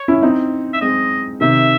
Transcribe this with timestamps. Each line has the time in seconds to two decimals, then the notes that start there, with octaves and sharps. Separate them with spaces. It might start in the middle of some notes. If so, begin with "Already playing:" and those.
Already playing: C#5
0.08 C#4 E4
0.22 C4 D#4
0.73 E5
0.81 G#3 C4 D#5
1.41 C3 D#3 E5